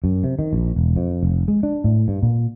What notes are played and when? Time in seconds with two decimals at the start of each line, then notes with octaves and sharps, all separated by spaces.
0.04 F#2
0.24 C3
0.39 D#3
0.53 A#1
0.76 E1
0.96 F2
1.23 F1
1.48 G#3
1.63 D4
1.84 A2
2.08 G2
2.23 A#2